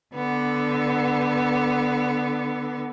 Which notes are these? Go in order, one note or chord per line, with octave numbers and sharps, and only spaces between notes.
D3 B3